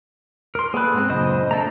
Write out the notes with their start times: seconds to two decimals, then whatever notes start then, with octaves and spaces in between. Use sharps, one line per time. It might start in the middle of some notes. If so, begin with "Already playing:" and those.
0.55 A#4 C6
0.74 A#3 G#4 A4 B4 F#6
0.93 G#2 B3 C4
1.10 F#2 A#2 C#3 D4 C5 D#5
1.51 F3 A3 D4 A4 A#5